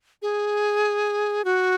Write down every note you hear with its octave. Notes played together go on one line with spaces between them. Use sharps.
G#4
F#4